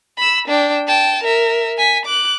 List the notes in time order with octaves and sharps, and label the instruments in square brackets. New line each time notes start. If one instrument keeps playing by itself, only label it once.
[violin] B5 E6
D4 G5
G5 A5
A#4 E5
G#5 B6
D6 F#6